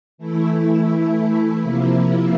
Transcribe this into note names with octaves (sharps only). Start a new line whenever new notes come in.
E3 A3 E4
C3 F3 A#3 E4